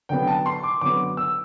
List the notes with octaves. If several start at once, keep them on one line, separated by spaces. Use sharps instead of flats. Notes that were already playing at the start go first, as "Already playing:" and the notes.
D3 F#3 B3 G5
A5
C6
D6
D3 F#3 B3 D6
E6